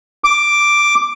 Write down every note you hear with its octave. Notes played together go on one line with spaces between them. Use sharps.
D6